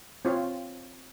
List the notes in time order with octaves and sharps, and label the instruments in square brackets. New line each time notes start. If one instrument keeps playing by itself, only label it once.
[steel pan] C4 F4 C#5 F5